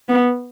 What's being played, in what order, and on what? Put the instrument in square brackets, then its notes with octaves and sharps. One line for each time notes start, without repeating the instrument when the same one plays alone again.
[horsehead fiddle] B3